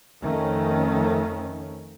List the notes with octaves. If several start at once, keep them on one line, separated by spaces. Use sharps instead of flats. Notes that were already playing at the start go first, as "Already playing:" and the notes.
F2 D#3 A3 C#4